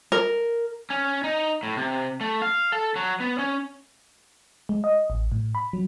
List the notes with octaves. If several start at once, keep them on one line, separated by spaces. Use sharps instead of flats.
A#4
C#4
D#4
A2
C3
A3
F5
A4
F#3
B3
C#4
G#3
D#5
A1
A2
B5
F#3